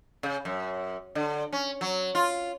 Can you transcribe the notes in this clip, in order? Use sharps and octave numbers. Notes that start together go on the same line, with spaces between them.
C#3
F#2
D3
C#4
F#3
F4